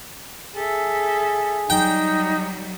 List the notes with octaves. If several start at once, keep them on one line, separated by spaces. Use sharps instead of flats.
G#4 A4 E5
F#3 G3 D#4 G5